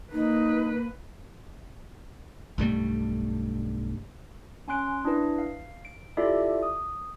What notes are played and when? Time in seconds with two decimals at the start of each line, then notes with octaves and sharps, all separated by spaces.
0.12 A#3 D#4 B4
2.58 B1 G2 G3 A3
4.68 C#4 G#5 C6 F#6 D7
5.05 D4 E4 B4
5.38 F5
5.85 D7
6.17 E4 F4 G4 A4 D5 E5
6.63 D#6